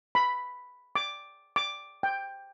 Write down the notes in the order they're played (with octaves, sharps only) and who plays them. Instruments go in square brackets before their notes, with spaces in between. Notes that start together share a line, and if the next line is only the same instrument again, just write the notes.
[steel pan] B5
D6
D6
G5